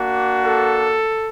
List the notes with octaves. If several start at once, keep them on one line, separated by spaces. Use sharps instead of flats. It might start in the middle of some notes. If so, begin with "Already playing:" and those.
Already playing: A#3 D4 F#4
A4